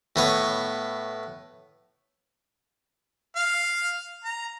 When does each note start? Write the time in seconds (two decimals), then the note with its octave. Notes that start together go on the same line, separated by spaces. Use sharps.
0.16 A2 B3 C#5
3.36 F5
4.24 A#5